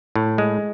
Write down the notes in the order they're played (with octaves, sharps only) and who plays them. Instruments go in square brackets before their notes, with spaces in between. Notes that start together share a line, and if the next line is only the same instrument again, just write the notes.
[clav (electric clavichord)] A2
G#3